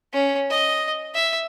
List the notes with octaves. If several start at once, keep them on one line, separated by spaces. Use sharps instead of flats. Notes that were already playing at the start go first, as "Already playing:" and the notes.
C#4
D#5
E5